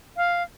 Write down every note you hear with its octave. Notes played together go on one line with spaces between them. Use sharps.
F5